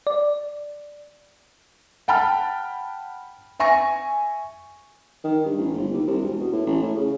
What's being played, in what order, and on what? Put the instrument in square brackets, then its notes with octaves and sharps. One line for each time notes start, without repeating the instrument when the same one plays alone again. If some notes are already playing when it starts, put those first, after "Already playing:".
[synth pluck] D5
[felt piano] F#5 G5 A5 B5 F6
E5 G#5 C#6 A#6
[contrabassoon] D#3
G2
A1
G1
D#2
C2
E1
B2
A2
A1
A2
C#3